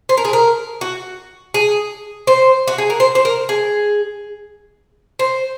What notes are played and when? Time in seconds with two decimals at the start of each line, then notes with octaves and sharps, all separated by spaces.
0.09 C5
0.17 A#4
0.25 G#4
0.33 A#4
0.81 F#4
1.54 G#4
2.27 C5
2.67 F#4
2.78 G#4
2.90 A#4
3.00 C5
3.15 C5
3.25 A#4
3.49 G#4
5.19 C5